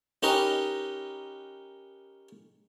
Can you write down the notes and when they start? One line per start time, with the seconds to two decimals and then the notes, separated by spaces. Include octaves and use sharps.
0.23 C#4 D#4 G4 A#4 B4 D#5